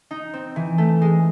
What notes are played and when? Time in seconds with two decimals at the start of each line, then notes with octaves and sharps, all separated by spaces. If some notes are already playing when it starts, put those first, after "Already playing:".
0.11 D#4
0.33 C4
0.56 E3
0.78 A3
1.02 G#3